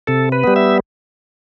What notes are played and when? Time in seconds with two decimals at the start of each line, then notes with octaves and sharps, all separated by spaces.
0.07 C3 A4
0.32 B4
0.44 G3 B3
0.56 E5